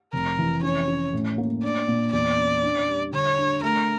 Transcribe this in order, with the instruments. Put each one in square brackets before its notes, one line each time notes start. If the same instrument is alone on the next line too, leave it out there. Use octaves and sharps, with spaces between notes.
[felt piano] F1 [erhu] A#4
[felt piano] E3
[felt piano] C#4 [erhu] C#5
[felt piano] C#4
A2
A#3
[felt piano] D4 [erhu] D5
[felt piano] A#2
[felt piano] E2 [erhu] D5
[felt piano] C#4
D4
G3
[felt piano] D3 [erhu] C#5
[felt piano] D4
[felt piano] A3 [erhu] A#4